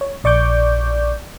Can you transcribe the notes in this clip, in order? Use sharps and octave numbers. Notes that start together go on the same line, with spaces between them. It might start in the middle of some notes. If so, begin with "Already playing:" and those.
C#5
A#1 D5 C#6 D6 G6